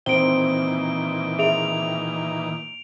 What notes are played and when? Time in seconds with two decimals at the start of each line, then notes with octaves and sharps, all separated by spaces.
0.06 A#2 D#3 E3 C4 D7 G7
1.39 G#4 E5 D7 F7